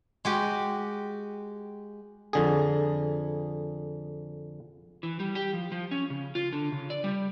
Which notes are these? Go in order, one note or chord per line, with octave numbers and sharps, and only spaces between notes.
G#3 F#4 G4
F2 D3 G#4
E3
G3
G4
F3
F3
C#4
C#3
F4
D3
C#3
D5
G3